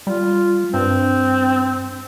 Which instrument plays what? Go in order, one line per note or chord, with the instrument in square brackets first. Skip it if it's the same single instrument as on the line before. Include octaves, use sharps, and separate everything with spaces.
[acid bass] G3 [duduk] F4
[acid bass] G2 [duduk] C4